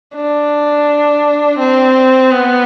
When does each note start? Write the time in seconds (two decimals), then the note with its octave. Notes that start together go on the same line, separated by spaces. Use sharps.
0.16 D4
1.59 C4
2.32 B3